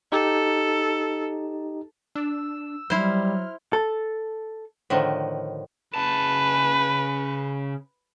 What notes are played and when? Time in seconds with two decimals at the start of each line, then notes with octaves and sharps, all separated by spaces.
0.12 D#4 G4 A4
2.15 D4 E6
2.90 F#3 G3 E4 C5 F6
3.73 A4
4.90 A2 D3 D#3 F3
5.94 C#3 B4 A5